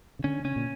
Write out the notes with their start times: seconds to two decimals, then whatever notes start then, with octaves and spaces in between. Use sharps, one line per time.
0.19 C#3
0.24 D3 C#4
0.44 C#3 C#4
0.56 A#2